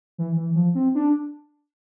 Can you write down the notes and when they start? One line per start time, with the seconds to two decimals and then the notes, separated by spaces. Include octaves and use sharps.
0.18 E3
0.37 E3
0.56 F3
0.75 C4
0.95 D4